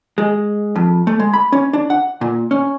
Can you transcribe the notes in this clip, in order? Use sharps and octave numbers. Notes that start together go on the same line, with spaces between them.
G#3
F2
A3
G#3
B5
C#4
D4
F#5
A#2
C#4